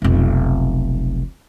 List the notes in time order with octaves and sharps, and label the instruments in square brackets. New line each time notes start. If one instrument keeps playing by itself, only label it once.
[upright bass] F1 B1